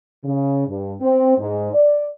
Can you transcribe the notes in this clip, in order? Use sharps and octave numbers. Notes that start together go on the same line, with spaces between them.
C#3
G2
C4
G#2
D5